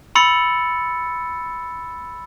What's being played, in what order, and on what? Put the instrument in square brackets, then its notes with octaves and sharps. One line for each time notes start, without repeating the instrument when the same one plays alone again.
[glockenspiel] B5 C6 E6 A6 C#7